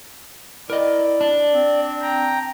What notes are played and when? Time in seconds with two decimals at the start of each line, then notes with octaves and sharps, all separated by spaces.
0.70 E4 A#4 D5 D#5
1.21 D4
1.53 C4
2.01 G5 A#5